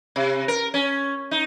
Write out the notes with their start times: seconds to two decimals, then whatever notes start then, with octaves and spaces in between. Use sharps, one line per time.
0.16 C3
0.48 A#4
0.74 C#4
1.31 D#4